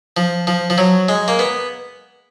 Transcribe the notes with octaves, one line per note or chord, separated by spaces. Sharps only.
F3
F3
F3
F#3
G#3
A#3
B3